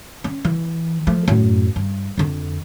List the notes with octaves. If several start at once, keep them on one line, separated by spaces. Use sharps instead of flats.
C#4
E3
F3 A3
F#2 A2
G2
F2 D3